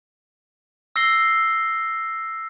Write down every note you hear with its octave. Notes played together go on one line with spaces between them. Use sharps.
E6 A#6 C7 G7